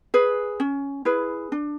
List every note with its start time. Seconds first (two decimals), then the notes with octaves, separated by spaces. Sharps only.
0.14 G#4 B4
0.60 C#4
1.05 E4 G#4 B4
1.52 D4